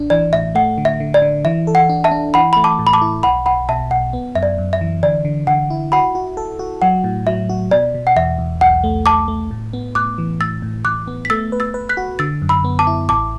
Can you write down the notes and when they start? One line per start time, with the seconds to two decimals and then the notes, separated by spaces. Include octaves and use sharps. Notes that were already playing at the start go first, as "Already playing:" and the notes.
Already playing: A1 D4
0.10 E3 D5
0.33 A2 E5
0.55 A3 F#5
0.78 D3
0.85 E5
1.00 D3
1.14 D5
1.22 D3
1.45 E3 E5
1.67 A4
1.75 F#5
1.89 D4
2.04 E5 A5
2.11 D4
2.34 E3 F#5 B5
2.53 A3 B5
2.64 A5 D6
2.79 A2
2.87 B5
2.93 A5 D6
3.02 E4
3.23 B1 F#5 B5
3.46 B1 F#5 B5
3.69 B2 E5 A5
3.91 B1 F#5
4.13 B3
4.35 F#2 E5
4.43 D5
4.58 F#2
4.73 E5
4.81 E3
5.03 D3 D5
5.25 D3
5.47 D3 F#5
5.70 E4
5.92 F#4 F#5 B5
6.15 F#4
6.37 A4
6.59 F#4
6.82 F#3 F#5
7.04 A2
7.27 F#3 E5
7.49 F#4
7.71 B2 D5
7.94 B2
8.07 F#5
8.16 E2 E5
8.39 E2
8.61 B1 F#5
8.84 A3
9.06 B1 A5 D6
9.28 A3
9.51 A2
9.73 B3
9.95 A2 D6 F#6
10.18 E3
10.40 A2 E6 A6
10.62 A2
10.85 A2 D6 F#6
11.08 B3
11.25 B6
11.30 A3 E6 A6
11.52 B4
11.60 E6 A6
11.74 B4
11.89 F#6 B6
11.97 F#4
12.19 D3 E6 A6
12.42 F#2
12.49 B5 E6
12.64 B3
12.79 A5 D6
12.87 E4
13.09 A1 A5 D6